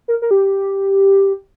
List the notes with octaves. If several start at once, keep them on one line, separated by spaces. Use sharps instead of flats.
A#4
A#4
G4